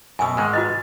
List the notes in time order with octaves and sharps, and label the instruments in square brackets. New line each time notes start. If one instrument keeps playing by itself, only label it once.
[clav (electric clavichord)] F#2 B2 [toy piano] G#5 D#6 E6
[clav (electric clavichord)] G#2 D#3 G#3
[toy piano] F#4 B4 D#5